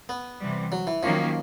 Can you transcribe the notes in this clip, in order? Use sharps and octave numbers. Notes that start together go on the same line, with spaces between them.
B3
C3 E3 G3
F#3
E3
D#3 F3 F#3 A#3 C#4